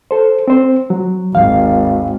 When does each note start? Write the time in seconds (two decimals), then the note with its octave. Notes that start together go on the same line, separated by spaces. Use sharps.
0.11 A4 C5
0.48 C4 C5
0.90 F#3
1.35 G#1 D#2 F5